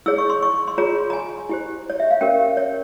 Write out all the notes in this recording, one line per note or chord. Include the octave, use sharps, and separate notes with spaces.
E4 G#4 C#5 E6
C#6
C6
C#6
C6
F4 G#4 C#5 A#5
A#5
G#5
E4 G4 C5
C#5
E5
F5
C#4 G4 A#4 C#5 G5
C#5